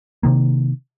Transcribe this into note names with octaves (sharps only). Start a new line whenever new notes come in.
C3 D#3 A#3